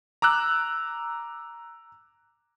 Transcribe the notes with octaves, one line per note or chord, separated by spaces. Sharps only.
A#5 D6 E6 F#6